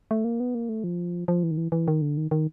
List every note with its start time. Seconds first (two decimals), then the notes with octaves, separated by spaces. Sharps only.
0.11 A3
0.24 A#3
0.40 B3
0.55 A#3
0.69 A3
0.84 F3
1.28 F3
1.43 E3
1.51 D#3
1.57 E3
1.72 E3
1.88 D#3
2.01 D3
2.17 D#3
2.31 D#3